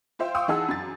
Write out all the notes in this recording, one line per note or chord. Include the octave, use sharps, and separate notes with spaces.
F4 C5 E5 F5 G5
F5 G5 C6 C#6 D#6 E6
E3 D#4 G#4 F#5 A5 E6
F#2 A6